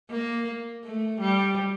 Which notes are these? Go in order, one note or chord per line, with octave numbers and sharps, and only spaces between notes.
A#3
A3
G3